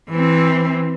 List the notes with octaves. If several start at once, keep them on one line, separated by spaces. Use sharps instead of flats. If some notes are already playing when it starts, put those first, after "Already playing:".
E3 C4